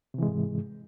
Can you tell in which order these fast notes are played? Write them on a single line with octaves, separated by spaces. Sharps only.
C3 E3 G#3 G#2